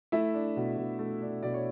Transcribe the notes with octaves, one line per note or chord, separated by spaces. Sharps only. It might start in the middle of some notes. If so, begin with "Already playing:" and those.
A3 E4 E5
D4
B2
B2
A3
D4
B2 D5
C#5